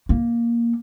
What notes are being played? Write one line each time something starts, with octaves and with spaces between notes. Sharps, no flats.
A#3